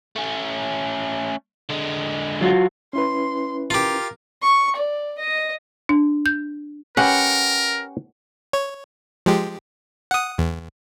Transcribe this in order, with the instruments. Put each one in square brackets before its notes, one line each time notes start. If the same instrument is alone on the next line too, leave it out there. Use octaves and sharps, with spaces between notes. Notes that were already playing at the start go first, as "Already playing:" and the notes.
[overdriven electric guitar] A3 C#4
D3 G#3
[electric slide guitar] F#3 F4 F#4
[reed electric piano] C#4 E4 B4 [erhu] C6
[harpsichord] F4 G4 [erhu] A#4
[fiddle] C#6
D5
D#5
[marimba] D4
G6
[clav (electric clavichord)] C#4 G4 B4 [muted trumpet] A#4 [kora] F#5
[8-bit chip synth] C#5
F3 G#3 G4
F#5 D#6
E2